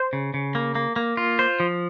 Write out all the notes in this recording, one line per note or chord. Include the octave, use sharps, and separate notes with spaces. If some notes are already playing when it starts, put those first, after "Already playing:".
Already playing: C5
C#3
C#3
A#3
A#3
A#3
F4
C5
F3